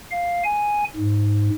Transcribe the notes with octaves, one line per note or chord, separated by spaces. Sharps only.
F5
G#5
G#2